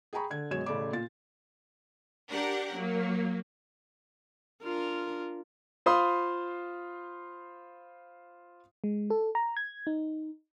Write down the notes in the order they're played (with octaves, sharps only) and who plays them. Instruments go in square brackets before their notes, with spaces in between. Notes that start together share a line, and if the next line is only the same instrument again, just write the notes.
[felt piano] G#4 G5 G#5 A#5 B5 C#6
D3 G#6
F#2 B2 G#3 C#5 G#6 E7
A1 C#3 A3 D5 B5 D6
A#2 F4 A6
[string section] D4 G4 A#4 F#5
F#3 A#3
[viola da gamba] D4 A#4 [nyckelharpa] F4
[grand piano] F4 C5 F5 B5 C6 D#6
[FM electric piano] G#3
A4
A#5
G#6
D#4